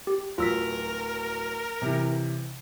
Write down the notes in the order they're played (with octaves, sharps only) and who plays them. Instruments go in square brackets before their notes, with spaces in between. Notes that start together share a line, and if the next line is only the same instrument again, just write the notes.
[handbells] G4
[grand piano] D1 F#3 [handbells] F4 E6 B6 [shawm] A#4
[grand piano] C3 E3